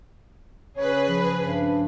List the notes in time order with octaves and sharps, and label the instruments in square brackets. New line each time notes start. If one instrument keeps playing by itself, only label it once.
[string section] C#3 G#4 B4 [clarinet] C#5
[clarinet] F3
[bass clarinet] G2